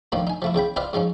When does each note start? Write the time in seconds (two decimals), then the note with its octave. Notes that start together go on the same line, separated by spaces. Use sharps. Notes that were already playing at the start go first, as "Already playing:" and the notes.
0.12 A2 D3 D#3 F3 A#3
0.27 D#4 G#5
0.42 F3 A3 E4
0.54 E2 C#3 G5 B5
0.76 C4 F4 B4 D5 D#5 F5
0.93 G#2 F3 C#4 D#4